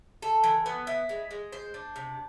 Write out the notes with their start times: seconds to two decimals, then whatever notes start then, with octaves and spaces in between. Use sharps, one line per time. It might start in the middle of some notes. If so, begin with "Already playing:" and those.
0.22 A4
0.44 E3
0.66 B3
0.87 E4
1.09 G#3
1.31 G#3
1.53 C5
1.74 D4
1.96 C3